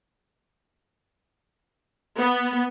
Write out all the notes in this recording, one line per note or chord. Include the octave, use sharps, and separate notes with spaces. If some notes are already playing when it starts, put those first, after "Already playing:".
B3